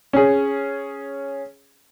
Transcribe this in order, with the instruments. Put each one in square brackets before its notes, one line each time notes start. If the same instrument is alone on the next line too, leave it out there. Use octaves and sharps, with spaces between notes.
[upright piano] C#4 G#4